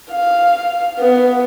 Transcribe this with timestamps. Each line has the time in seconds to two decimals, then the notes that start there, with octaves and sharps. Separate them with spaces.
0.12 F5
0.99 B3